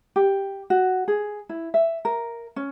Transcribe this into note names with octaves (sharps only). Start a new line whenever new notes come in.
G4
F#4
G#4
E4
E5
A#4
C#4